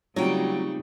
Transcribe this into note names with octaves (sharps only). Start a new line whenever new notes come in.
C#3 F#3 G3 A3 C4 D#4 F4 G5